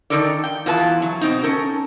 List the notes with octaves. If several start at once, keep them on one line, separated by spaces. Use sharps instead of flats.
D#3 F#3 D4 A4 A#4 D5
G5
E2 E3 F4 B4 A5
F#3
B2 C4 D#4
C#4 A4 A#4